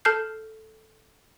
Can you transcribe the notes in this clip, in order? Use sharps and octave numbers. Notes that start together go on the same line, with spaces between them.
A4 A5 F6 G6 C7